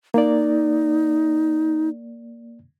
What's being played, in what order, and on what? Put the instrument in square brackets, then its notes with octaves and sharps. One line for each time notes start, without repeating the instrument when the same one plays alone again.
[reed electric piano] A#3 D5 [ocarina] D#4